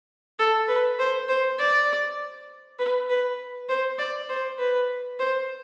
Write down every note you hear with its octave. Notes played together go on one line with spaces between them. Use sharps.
A4
B4
C5
C5
D5
B4
B4
C5
D5
C5
B4
C5